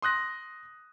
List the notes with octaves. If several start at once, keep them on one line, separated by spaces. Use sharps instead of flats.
C6 D#6 F#6 A#6